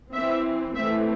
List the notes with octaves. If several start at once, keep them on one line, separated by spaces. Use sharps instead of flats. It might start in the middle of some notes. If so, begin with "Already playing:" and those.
E3 C4 E5
E3 A3 C4 E5